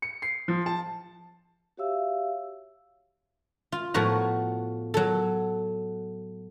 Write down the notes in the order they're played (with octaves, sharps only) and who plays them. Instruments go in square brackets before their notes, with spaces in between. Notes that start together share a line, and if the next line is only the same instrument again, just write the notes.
[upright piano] C#7
C7
F3
A5
[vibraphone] F#4 G4 C#5 E5 F5 E6
[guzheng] F4
A2 F3 B3 F#4 A#5
F#3 A4